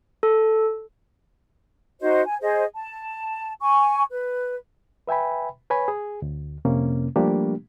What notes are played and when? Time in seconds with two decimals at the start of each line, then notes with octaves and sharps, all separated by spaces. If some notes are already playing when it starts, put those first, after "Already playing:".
0.23 A4
2.01 D#4 F#4 C5 D#5
2.24 G#5
2.41 G#4 C5 D#5
2.74 A5
3.60 G#5 C#6
4.10 B4
5.08 B4 E5 G5 G#5 B5
5.70 B4 C#5 G#5 B5
5.88 G#4
6.22 D2
6.65 F2 C3 A#3 C#4
7.16 F3 G3 A3 A#3 D4 G4